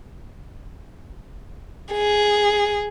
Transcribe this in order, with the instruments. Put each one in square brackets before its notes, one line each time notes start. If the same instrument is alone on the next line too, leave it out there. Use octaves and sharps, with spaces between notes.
[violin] G#4